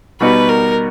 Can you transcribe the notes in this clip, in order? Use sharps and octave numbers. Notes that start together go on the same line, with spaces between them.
B2 G3 B3 D#4 F#4 B4
A#4